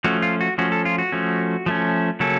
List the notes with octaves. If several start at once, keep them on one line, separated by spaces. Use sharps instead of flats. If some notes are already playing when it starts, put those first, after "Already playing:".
F3 A3 C#4 F#4
F4
F#4
F3 A3 C#4 F#4
A4
F4
F#4
F3 A3 C#4
F3 A3 C#4
C#3 F#3 A#3 C#4 A4